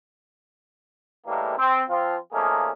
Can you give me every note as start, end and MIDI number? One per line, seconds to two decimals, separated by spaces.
1.27 1.55 45
1.27 1.55 52
1.27 1.55 55
1.27 1.55 56
1.27 1.55 58
1.58 1.82 60
1.90 2.17 53
1.90 2.17 60
1.90 2.17 65
2.33 2.71 53
2.33 2.71 57
2.33 2.71 58
2.33 2.71 61
2.33 2.71 63
2.33 2.71 68